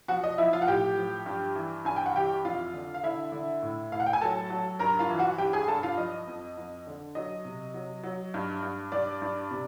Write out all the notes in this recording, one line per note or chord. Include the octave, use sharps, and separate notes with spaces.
F3 F#4 F#5
D#5
F3 E4 E5
F4 F5
F#5
A2 G4 G5
F3
G2
E3
G2 G#5
G5
F#5
E3 G4 G5
F2 F4 F5
D3
F5
D3 E4 E5
D3
A2
A2 F5
F#5
G5
G#5
F#3 A4 A5
F#3
G2 A#4 A#5
F4 F5
E3
F#4 F#5
G2 G4 G5
G#4 G#5
G2 A4 A5
F4 F5
F3 D#5
F2
F2
D3
F#3 D#5
C3
F#3
F#3
G2
G2
G2 D5
G2
C3